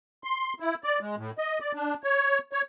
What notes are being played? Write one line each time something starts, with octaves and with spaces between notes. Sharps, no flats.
C6
E4
D5
G#3
A2
D#5
D5
D4
C#5
C#5